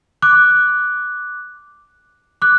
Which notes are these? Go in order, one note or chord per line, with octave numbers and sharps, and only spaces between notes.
D6 F#6
D6 F#6